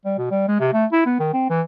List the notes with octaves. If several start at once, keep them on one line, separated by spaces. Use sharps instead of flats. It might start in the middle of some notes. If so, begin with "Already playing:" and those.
G3
B2
G3
G#3
C3
A3
E4
B3
D#3
C4
E3